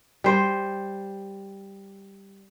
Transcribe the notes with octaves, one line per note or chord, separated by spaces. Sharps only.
G3 C5